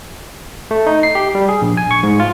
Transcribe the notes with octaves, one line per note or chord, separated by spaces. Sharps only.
A3
D#4
C7
G4
G3
G#4
A#1
G#5
C#6
G#2
F4